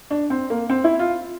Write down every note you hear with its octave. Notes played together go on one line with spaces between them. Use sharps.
D4
C4
A#3
C4
E4
F4